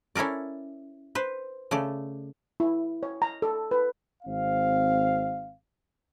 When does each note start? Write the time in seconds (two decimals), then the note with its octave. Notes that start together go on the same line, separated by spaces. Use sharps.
0.15 C#4 E4 A4 A#4 D5
1.15 B4 C5
1.71 C#3 A3 D5
2.60 E4
3.03 C#5
3.22 A#5
3.42 A4
3.71 B4
4.23 G#1 C4 F5